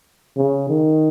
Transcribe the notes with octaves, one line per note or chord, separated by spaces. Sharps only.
C#3
D#3